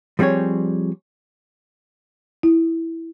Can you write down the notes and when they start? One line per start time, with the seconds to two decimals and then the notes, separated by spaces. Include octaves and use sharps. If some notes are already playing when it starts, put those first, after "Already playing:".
0.19 F3 G3 C4 G#4 C#5
2.43 E4